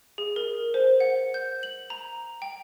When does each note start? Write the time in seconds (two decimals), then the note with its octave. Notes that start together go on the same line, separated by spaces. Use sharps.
0.18 G#4
0.36 A#4
0.74 C5
1.00 F#5
1.34 G6
1.63 F#7
1.90 A#5
2.42 G5